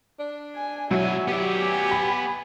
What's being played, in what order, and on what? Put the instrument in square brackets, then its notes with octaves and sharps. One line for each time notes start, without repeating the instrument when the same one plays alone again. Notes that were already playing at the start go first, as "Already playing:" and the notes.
[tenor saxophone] D4
[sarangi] G#5
[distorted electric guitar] B2 G#5 [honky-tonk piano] F#3 [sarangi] E4
[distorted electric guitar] B3 D5 [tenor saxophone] G4
[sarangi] G#5
[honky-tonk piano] B5